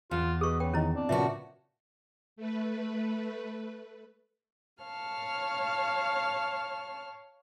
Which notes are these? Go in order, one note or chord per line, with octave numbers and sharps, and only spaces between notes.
E2 F4
B2 G#4 C#6 D#6
C#3 B4 G5
D#3 C#4 E4 D#5 A#5
C4 D4
A#2 C#3 F4 F#4 B4 E5 A5
A3 B4
C#5 F5 A5 F6